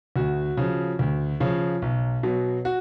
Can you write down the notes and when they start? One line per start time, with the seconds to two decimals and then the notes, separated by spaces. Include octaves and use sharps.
0.16 D2 F#4
0.57 C#3 F3
0.99 D2
1.40 C#3 F3
1.82 B1
2.23 B2 F#3
2.65 F#4